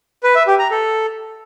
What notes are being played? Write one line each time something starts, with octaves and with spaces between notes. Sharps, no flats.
B4
E5
G4
A#5
A4